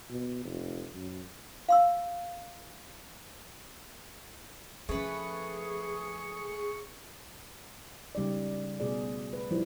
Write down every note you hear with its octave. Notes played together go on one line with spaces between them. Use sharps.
B2
F1
F#2
F5 C6 E6
F3 A3 C#4 G#4 B4 C#6
C#3 G3 D#4 D5
B2 A3 G#4 D5
B4
F3 G3 D#4 E4